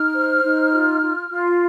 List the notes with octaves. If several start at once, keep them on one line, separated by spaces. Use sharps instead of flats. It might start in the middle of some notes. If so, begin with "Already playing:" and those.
Already playing: D#4 F6
C5
D#4
F4
F4
F4